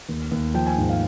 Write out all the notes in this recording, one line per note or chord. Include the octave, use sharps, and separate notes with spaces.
D#2
D#2
F3 G5
G#5
G#2
F5